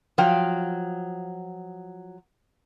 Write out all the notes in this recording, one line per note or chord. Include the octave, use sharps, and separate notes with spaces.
F3 F#3 F5 G5